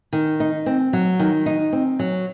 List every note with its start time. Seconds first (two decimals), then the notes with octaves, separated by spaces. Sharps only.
0.13 D#3
0.40 D#4
0.66 C4
0.93 F#3
1.19 D#3
1.46 D#4
1.73 C4
1.99 F#3